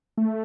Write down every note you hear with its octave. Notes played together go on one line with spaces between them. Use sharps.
A3